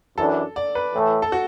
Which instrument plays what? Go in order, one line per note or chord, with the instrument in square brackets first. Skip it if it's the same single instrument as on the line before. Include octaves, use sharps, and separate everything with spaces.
[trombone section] F#2 E3 D4 [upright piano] A4
[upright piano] D5
B4
[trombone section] A2 E3 A3
[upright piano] A4
F#4